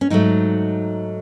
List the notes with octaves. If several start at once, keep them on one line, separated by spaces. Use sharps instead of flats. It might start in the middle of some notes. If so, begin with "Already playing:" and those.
C#4
G#2 F#3 A3 D#4